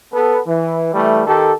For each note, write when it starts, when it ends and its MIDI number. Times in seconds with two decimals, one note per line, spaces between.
0.13 0.41 59
0.13 0.41 69
0.47 0.91 52
0.94 1.25 52
0.94 1.25 55
0.94 1.25 57
1.26 1.53 51
1.26 1.53 67
1.26 1.53 69